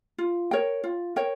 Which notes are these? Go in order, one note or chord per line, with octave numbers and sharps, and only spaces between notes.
F4
A#4 C#5 G5
F4
A#4 C#5 G5